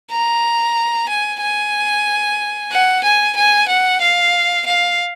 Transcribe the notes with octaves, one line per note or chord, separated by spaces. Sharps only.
A#5
G#5
G#5
F#5
G#5
G#5
F#5
F5
F5